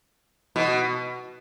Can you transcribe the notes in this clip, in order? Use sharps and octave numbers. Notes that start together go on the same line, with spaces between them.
B2